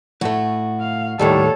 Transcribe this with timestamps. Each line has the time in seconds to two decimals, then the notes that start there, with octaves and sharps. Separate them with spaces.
0.21 A2 A3 F#4
0.80 F5
1.19 D#2 A2 D#3 G3 A4 C#5